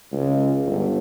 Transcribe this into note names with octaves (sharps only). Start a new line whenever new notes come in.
C#2
G1